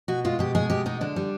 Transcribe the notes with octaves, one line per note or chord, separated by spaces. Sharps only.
B2 F#4
G#3 F4
B2 G4
G#3 G#4
B2 G4
G#3 D#4
D3 D4
G3